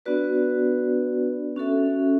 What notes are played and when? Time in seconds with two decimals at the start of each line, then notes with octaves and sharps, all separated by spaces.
0.06 B3 D4 F#4 B4 D5
1.56 C#4 F#4 A4 E5